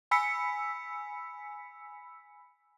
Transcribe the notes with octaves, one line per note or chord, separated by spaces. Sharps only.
G#5 B5 E6 B6 C#7